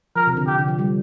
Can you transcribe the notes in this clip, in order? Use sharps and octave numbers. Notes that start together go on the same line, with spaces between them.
F3 A#4
C3
D3
C3 G4
D3
F3
G3